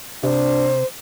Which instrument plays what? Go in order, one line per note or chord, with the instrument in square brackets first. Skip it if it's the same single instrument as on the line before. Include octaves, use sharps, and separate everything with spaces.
[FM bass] C3 [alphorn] D4 [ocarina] C5